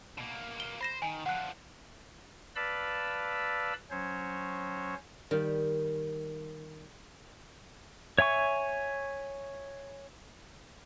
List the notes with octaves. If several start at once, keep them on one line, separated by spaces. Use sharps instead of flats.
B2 A#3
G7
C5 B5 A#6 E7
D#3 G#5
D3 F3 F#5 F#6
B4 D5 F5 A5 B5 E6
F#3 C#4 C5 C#5
D#3 G3
C#5 E5 G#5 C#6